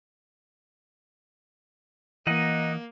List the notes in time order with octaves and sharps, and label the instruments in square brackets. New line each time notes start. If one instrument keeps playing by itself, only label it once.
[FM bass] E3 [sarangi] A#3 [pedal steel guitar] D#4 D#5 F#5